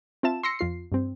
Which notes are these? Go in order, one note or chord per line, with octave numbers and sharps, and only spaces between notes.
C4 F4 E5 A5 E7
C6 E6 A#6 C7 C#7
F2 F4 C7
G2 C4